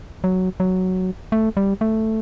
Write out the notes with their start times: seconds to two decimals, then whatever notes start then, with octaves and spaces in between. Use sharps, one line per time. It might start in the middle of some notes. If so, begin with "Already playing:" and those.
0.24 F#3
0.60 F#3
1.32 A3
1.57 G3
1.81 A3